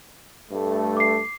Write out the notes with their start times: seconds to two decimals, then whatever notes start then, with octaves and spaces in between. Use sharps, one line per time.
0.51 G2 A3
0.97 D6 C7